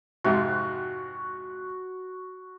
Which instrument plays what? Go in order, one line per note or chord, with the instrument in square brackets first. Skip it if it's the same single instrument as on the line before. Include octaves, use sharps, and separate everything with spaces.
[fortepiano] F2 G#2 C3 [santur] F#4